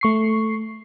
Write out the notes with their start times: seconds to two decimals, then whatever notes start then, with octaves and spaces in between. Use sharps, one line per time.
0.01 A3 C#6 C7